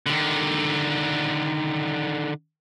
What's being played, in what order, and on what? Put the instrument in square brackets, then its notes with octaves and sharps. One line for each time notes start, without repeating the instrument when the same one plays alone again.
[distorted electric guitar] D3 D#3